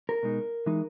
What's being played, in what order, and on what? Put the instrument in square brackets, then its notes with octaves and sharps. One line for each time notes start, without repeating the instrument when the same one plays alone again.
[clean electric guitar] A#4
B2 G#3 D#4
E3 G#3 D#4